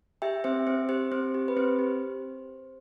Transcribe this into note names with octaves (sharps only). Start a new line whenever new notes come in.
G4 E5 G5
C4 C5 E5
C4 C5
G4 C5
C4 C5
G4
B4
C4 C5
G4